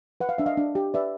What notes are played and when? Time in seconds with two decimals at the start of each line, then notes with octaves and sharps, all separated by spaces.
0.21 B4 F#5
0.29 F5
0.38 D4 E5
0.46 D#5 F5
0.57 D4
0.75 G4
0.94 B4 D5 E5